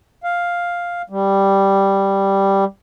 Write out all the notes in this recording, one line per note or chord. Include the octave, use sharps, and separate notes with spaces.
F5
G3